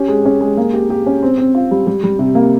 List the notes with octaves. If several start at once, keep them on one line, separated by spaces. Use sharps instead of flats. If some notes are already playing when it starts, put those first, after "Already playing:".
Already playing: C#4 G4
G#3
C#4
G#3
A#3
G4
G4
C#4
C4
C4
F4
G3
G3
G3
C3
A#3